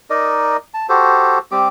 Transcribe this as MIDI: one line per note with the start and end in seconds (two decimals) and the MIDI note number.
0.10 0.57 63
0.10 0.57 70
0.10 0.57 74
0.10 0.57 75
0.74 0.86 81
0.89 1.38 66
0.89 1.38 67
0.89 1.38 69
0.89 1.38 72
1.52 1.68 55
1.52 1.68 60
1.52 1.68 67
1.52 1.68 86